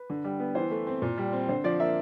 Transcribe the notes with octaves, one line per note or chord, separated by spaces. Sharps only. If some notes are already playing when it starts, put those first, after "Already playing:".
Already playing: B4
D3
G3
B3
E3 C5
A3
C4
A#2
G3
C4
D3 C5
F3 D5
A#3 E5